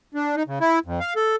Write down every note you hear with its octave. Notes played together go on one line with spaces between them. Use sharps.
D4
D#4
C#3
E4
F2
F5
A4